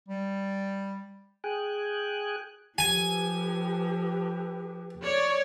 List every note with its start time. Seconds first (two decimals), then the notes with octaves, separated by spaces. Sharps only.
0.08 G3
1.44 G#4 G5 G#5 F#6
2.78 F3 G4 A4 B4 G#5
5.03 C#5 D5